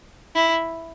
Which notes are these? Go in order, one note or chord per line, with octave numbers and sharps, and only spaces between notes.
E4